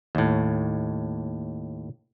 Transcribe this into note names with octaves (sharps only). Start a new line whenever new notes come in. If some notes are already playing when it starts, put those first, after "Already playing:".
D#2 A2